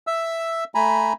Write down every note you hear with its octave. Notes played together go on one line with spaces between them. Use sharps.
E5 E6
A3 G#5 A#5 B5